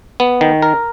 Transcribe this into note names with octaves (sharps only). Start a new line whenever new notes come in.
B3
D#3
A#4